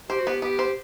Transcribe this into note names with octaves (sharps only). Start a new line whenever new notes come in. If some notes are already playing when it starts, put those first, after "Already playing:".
G4 C5
F#4
B3 G4
B3 G4
C5